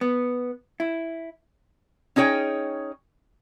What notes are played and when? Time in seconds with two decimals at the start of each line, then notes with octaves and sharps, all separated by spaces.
0.01 B3
0.80 E4
2.16 C#4 D#4 G#4 C#5 G5